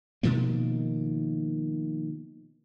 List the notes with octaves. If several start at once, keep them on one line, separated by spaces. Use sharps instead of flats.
B2 D#3 F3 A#3